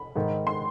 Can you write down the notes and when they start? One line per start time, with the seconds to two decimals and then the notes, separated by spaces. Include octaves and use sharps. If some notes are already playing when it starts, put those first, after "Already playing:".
Already playing: B5
0.16 G#2 D#3
0.47 C6